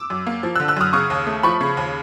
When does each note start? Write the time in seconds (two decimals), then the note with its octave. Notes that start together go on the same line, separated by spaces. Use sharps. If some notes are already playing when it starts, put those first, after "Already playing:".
Already playing: D6 E6
0.10 F#2
0.27 A#3
0.43 F3
0.56 D3 E6 F#6
0.68 E6 F#6
0.77 F#2 D#6 F6
0.93 C#3 C#6 D#6
1.10 D#2
1.27 A3
1.43 F3 B5 C#6
1.61 C#3
1.77 D#2